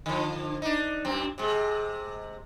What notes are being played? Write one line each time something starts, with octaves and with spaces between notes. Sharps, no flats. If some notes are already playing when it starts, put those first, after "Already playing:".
D3 F3
D4 D#4
F#2 C4
C3 G#3